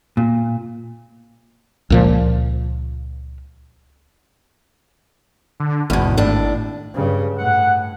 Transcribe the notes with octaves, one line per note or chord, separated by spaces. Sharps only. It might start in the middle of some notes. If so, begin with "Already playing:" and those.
A#2
C#2 A#2 F3
D3
G#1 E2 B2
D#2 A2 D4
G2 C#3
A2 F#5